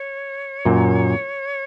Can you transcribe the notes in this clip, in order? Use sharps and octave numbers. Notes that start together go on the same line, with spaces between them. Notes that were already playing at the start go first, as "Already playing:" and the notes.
Already playing: C#5
F#2 A#2